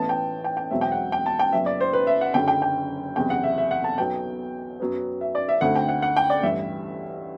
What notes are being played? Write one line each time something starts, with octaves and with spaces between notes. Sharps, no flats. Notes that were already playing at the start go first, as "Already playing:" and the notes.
Already playing: A1 A2 E3 B3 A5
G5
G5
G5
E1 E2 B2 F#3 C4 E5
G5
F#5
G5
A5
G5
F#1 F#2 F#3 B3 E5
D5
C5
B4
E5
F#5
F#1 F#2 D3 G5
G5
G5
F#1 E2 C3 G5
F#5
E5
E5
F#5
A5
B1 B2 F#3 B3 G5
F#2 F#3 B3
E5
D5
E5
D2 D3 A3 C4 F#5
G5
F#5
F#5
G5
D5
A1 G2 E3 E5